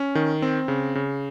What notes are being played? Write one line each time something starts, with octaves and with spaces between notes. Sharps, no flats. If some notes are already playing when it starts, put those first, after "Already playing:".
Already playing: C#4
D#3
C4
C#3
C#3